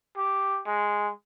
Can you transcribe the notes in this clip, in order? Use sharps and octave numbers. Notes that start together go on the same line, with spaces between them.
G4
G#3